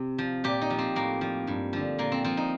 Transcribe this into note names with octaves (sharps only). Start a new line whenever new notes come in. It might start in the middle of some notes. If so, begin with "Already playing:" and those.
Already playing: C3
F3
A#2 G4
D#4
F3
C4
A2 A#3
F3
G2
D3 F3
A#2 A#3
C4
F3 C4
D#4